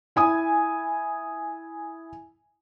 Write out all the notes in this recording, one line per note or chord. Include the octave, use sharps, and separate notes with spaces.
E4 G#5 D#6